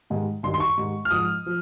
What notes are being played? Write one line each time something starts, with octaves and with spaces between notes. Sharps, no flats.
G#2 D#3 G3
G2 D#3 G3 C6
C6
C#6
G#2 D#3 G3
F6
G#2 F3 D#6
F3